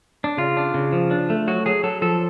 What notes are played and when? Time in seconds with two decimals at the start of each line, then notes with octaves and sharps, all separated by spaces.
0.24 D4
0.37 C#3 F4
0.57 D4
0.74 C#3
0.92 F3
1.11 D4
1.30 A3
1.48 F#3 F#4
1.66 F#3 G#4
1.83 F#3 A4
2.02 F3 A4